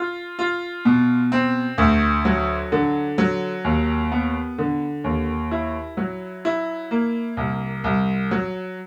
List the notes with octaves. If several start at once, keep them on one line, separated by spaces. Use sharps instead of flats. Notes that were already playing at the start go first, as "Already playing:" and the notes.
Already playing: F4
F4
B2
C4
D2
F#3
D3
F#3
D#2
B3
D3
D#2
E4
F#3
E4
A#3
C2
C2
F#3